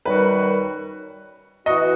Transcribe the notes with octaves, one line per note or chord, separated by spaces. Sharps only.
F#2 D#3 G3 D#4 F#4 B4
E3 B3 F#4 D#5